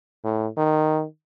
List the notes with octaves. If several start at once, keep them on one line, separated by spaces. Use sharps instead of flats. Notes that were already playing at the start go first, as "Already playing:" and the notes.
A2
D#3